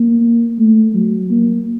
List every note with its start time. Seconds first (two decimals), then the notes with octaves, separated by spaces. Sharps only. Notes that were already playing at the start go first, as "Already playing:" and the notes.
Already playing: A#3
0.58 A3
0.94 F#3
1.30 A#3